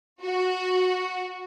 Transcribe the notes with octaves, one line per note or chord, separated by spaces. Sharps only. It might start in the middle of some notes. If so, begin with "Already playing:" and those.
F#4